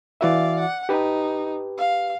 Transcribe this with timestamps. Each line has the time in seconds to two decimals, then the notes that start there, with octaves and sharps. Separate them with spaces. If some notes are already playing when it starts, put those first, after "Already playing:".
0.21 E3 F#4 D5 E5 F5
0.59 F#5
0.89 D#4 G4 B4
1.77 F5